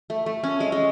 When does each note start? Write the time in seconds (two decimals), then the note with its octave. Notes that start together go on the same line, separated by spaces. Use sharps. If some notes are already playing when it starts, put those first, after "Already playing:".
0.10 A3
0.26 A3
0.43 C#4
0.60 G#3
0.72 G#3